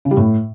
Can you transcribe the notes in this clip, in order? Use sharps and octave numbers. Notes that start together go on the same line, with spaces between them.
C#3
G3
A2